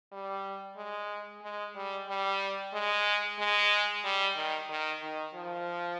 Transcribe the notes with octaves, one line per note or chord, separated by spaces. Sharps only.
G3
G#3
G#3
G3
G3
G#3
G#3
G3
D#3
D#3
D#3
F3